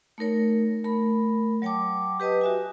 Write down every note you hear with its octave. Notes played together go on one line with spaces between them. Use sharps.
A3 D#4 A#4 C#5
A3 A#4 B5
F#3 C#5 G5 A5 D6
G4 B4 D#5 A5 D#6
F#4 E5 G#5